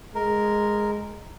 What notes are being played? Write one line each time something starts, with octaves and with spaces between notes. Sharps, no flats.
G#3 A#4